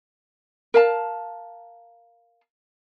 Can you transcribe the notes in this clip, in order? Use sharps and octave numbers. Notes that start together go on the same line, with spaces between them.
A#4 F5 A5